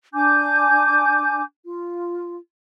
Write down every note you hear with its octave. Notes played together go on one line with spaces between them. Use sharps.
D4 G#5 D6 G6
F4